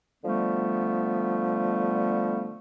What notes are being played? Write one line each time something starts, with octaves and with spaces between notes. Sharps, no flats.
D3 F3 G3 A3 B3